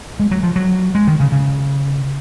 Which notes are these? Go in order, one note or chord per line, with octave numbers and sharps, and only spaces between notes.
G#3
F#3
F3
F#3
G#3
D#3
C#3
C#3